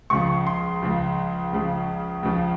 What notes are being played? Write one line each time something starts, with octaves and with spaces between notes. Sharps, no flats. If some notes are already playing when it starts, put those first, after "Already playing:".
C#2 C#3 F3 C#6
C6
C#2 C#3 F3
C#2 C#3 F3
C#2 C#3 F3